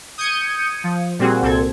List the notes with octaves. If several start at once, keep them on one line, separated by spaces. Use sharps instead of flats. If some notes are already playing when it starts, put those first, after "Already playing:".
D#6 G6 G#6 C#7 D#7
F3
A#2 G3 C4 F#4 G#4
C2 A#2 C4 A4 G#6